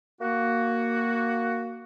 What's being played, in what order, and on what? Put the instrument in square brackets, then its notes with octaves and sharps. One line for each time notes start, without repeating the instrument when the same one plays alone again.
[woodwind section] A#3 F#4